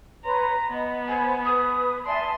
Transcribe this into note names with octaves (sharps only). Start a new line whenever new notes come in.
B4 C#5 A#5 C6
B3 D#5
C5 G#5 B5 G#6
B4 D#6
D5 E5 G#5 A5 C6